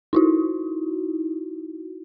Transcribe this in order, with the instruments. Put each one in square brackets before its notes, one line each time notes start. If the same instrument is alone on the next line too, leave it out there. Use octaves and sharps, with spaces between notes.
[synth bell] D#4 E4 F#4